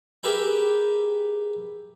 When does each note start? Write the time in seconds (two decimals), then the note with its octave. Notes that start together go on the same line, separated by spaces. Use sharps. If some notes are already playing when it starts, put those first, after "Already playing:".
0.23 G4 G#4 A#4 B4 E5 G5